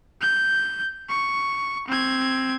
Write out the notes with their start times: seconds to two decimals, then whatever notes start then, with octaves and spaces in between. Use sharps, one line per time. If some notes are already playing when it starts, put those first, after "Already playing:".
0.22 G6
1.09 C#6
1.88 C4 G#6